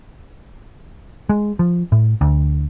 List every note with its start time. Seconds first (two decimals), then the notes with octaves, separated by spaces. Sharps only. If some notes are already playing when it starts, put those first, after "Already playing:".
1.29 G#3
1.59 F3
1.92 A2
2.21 D2